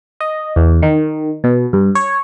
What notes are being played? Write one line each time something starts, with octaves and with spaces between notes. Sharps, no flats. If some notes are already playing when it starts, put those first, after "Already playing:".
D#5
E2
D#3
B2
G2
C#5